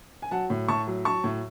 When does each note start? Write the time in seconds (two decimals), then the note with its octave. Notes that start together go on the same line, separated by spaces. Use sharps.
0.22 G#5
0.31 F#3 F#5 A5
0.50 A2
0.68 A2 A5 C#6
0.87 F#3
1.05 F#3 A5 C#6
1.24 A2